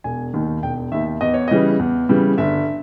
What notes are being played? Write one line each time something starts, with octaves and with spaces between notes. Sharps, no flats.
E1 G#5
D#2 D#3
E1 G5
D#2 D#3 E5
E2 D#5
C#5
C#3 E3 G3 D#5
E2
C#3 E3 G3
G1 E5